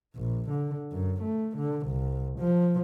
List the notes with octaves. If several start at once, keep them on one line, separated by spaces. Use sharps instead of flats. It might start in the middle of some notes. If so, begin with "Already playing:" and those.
A#1
D3
F#2
A3
D3
C2
F3